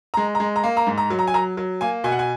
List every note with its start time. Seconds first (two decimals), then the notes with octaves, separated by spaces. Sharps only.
0.14 G#3 A#5
0.35 G#3 A#5
0.56 A#5
0.64 A#3
0.77 A#5
0.87 G#2
0.98 A#5
1.10 F#3
1.19 A#5
1.27 G#5
1.34 F#3 A#5
1.57 F#3
1.81 A#3 G#5
2.04 B2 G#5
2.12 F#5
2.19 G#5